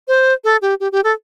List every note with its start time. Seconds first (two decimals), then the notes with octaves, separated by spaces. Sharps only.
0.08 C5
0.44 A4
0.62 G4
0.80 G4
0.92 G4
1.04 A4